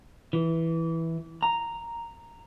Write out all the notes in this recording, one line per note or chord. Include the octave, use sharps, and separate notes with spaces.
E3
A#5